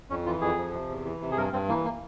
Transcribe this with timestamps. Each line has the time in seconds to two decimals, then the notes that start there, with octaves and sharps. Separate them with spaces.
0.10 F2 C#4
0.26 E3 F4
0.41 F2 G#4
0.58 F3
0.73 C3
0.89 E2
1.05 E3
1.21 C3
1.32 G#4
1.37 G2 A#4
1.53 G2 C4
1.69 E3 A#3
1.85 A#3